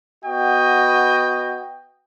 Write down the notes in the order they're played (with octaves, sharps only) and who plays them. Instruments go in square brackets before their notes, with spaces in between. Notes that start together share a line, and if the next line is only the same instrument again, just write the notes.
[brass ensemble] B3 F#4 D#5 G5